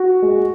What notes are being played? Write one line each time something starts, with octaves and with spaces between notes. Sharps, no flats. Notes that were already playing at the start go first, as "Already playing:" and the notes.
Already playing: F#4
G#3